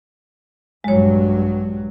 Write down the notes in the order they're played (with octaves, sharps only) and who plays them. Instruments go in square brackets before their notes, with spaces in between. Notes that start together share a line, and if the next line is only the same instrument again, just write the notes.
[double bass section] A#1 G2 F#3 [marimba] G#3 C#5